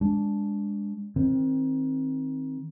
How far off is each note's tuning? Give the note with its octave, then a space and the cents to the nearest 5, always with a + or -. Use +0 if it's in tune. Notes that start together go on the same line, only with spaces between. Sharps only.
G#3 -25 D4 -15
D#3 +20 C4 +20